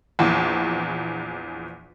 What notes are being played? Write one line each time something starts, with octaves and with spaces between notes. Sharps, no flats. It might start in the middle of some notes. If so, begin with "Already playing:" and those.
A#1 E2